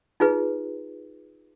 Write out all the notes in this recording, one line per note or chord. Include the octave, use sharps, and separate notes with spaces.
D#4 F4 G#4 B4